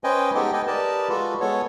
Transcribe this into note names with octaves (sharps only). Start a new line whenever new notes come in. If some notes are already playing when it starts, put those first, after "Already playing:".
C#4 B4 C5 D#5 G5 G#5
G#3 B3 D#4 G4 A4 G5
A4 B4 D#5 G5 G#5
G4 A#4 B4 D5 D#5 A5
G#3 F4 F#4 A4 B4
G#3 B3 A4 C#5